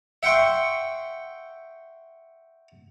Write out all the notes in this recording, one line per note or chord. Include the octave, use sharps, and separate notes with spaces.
E5 F#5 G5 C6 C#6